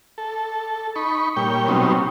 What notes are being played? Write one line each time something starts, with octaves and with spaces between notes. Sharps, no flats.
A4
D#4 B5 C#6
A#2 G3 C#5 G5
B2 F#3 G3 C4 C#4 D#4